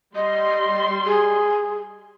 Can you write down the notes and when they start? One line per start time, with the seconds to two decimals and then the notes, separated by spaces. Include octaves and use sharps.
0.15 G3 D#5 C6
1.06 G#4